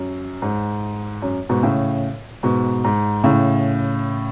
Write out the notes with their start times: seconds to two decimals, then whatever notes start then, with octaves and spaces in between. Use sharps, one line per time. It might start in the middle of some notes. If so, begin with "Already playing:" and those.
Already playing: F#2
0.42 G#2
1.22 F#2
1.49 G#2 B2
1.63 A2 C#3
2.43 G#2 B2
2.84 G#2
3.24 A2 C#3